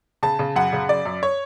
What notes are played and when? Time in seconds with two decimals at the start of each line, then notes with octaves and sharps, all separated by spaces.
0.23 C#3 A5
0.39 C#3
0.56 F#2 F#5
0.73 C#3
0.89 F#2 D5
1.06 F#2
1.23 C#5